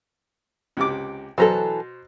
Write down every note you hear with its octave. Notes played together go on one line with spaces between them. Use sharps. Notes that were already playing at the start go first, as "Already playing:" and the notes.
C#2 C3 D6
B2 E3 F#3 A4 C5 A#5